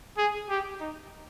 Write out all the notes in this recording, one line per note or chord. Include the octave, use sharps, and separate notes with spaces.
G#4
G4
D#4